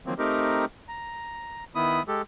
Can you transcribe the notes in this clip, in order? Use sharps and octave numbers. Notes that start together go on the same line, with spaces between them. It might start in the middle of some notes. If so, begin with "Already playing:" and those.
D#3 F3 F#3 A#3 C4
A3 C4 D#4 G4 A#4
A#5
D#3 B3 E4 B5 D#6
G#3 G4 A4